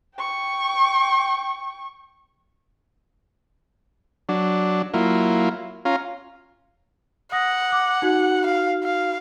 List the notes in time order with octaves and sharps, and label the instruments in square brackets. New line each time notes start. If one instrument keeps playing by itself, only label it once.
[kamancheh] G5 C#6
[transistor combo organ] F#3 D4
F#3 A#3 E4 F4
C#4 F4 F5 A#5
[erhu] F#5 [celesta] D#6 A#6
[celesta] D6
D#4 F#4
[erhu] F5
F5